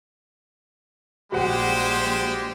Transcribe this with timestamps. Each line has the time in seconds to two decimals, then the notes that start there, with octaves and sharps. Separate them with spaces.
1.32 A#1 G3 G#3 F#4 G4 C5 F#5 G5